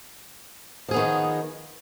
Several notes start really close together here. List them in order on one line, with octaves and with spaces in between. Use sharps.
F3 G#4 B3 D#3 D#4